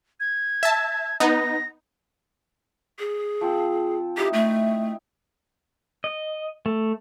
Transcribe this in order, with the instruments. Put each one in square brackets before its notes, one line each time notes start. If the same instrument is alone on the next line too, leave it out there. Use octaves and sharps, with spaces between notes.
[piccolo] G#6
[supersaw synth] E5 A5
[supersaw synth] B3 D#4 [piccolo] A#6
[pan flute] G#4
[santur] F3 C4
[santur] D#4 E4 C5 [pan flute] G4
[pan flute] A3
[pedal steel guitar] D#5
A3